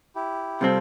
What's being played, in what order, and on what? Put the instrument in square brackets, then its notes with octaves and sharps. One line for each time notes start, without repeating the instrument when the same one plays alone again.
[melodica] E4 G4
[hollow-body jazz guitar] C3 G3 C4 [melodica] F4 A4